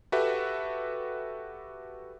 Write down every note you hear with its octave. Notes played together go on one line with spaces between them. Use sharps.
F#4 G4 A4 B4 E5 F#5